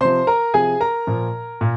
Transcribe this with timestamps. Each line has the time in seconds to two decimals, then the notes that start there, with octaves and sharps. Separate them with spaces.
0.01 C3 F3 C5 C6
0.27 A#4 A#5
0.54 C3 F3 G#4 G#5
0.80 A#4 A#5
1.07 A#2 F3
1.61 A#2